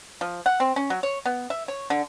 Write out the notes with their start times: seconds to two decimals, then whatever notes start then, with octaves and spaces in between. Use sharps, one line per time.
0.21 F3
0.46 F#5
0.60 C4
0.76 C#4
0.90 F#3
1.03 C#5
1.26 B3
1.50 E5
1.68 C#5
1.90 D3